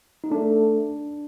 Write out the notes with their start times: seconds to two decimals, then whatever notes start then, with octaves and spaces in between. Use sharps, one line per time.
0.24 D#4
0.32 A3 D4